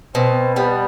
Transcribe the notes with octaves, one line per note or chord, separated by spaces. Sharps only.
B2 C4
G3 B3